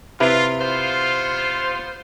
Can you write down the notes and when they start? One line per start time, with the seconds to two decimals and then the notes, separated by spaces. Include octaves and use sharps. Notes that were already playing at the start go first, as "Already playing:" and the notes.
0.20 C3 E4 F4 B4
0.61 B3 F4 C5